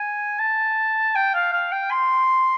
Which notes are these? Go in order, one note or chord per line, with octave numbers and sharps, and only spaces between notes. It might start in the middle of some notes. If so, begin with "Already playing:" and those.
Already playing: G#5
A5
G5
F5
F5
G5
C6